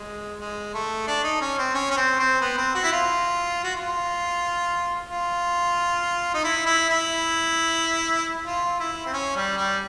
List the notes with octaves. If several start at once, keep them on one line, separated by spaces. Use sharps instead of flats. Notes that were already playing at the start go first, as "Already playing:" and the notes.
Already playing: G#3
G#3
A3
D4
D#4
C#4
C4
C#4
C#4
C4
C4
B3
C4
F#4
E4
F4
F#4
F4
F4
D#4
E4
E4
E4
F4
E4
C4
C#4
G3
G3